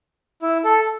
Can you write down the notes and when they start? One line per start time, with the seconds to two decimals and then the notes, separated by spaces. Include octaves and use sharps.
0.42 E4
0.64 A4